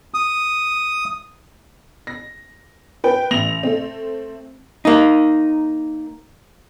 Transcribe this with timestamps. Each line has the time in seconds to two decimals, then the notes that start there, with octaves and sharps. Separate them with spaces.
0.14 D#6
2.07 A#6
3.04 B4 G5
3.31 A1 A#6 F7
3.63 A3 C4
4.85 A#3 D#4